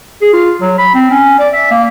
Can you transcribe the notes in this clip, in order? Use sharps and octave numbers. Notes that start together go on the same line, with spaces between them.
G#4
F4
F#3
B5
C4
C#4
D5
E5
A#3